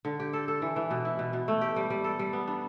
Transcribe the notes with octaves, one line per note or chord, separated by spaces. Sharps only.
D3
G4
A4
A4
E3
E3
B2
E4
B2
B2
A3
G4
G3
G3
A4
G3
B3
D4